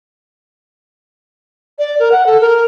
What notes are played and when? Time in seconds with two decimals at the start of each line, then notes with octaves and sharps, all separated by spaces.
1.79 D5
1.99 A#4
2.12 F#5
2.26 A4
2.41 A#4